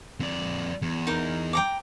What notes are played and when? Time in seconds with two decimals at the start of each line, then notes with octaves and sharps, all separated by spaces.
0.20 F2 D5
0.82 E2
1.07 D#4 A#4
1.53 G5 A#5 D6